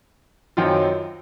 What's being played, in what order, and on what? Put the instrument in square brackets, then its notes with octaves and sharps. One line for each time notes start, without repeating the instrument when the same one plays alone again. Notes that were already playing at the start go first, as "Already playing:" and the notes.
[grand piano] F#2 D#3 F#3 C4 F4